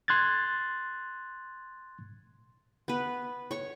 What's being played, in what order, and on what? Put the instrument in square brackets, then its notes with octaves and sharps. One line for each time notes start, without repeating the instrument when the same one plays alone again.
[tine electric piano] C6 F#6 G#6 A6
[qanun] B3 B4
C#5 C#6